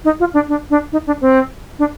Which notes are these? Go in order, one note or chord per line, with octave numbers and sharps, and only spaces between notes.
D#4
F4
D4
D4
D4
D#4
D4
C4
D4